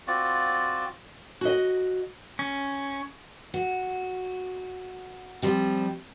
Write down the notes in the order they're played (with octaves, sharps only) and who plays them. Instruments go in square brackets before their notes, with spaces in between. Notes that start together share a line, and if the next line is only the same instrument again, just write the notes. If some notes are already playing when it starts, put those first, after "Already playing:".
[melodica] C4 F4 F#4 D5
[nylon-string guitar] F#4 D#5
[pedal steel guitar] C#4
[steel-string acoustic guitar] F#4
F3 G3 C4